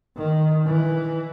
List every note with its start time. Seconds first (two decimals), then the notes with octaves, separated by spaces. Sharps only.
0.17 D#3
0.66 E3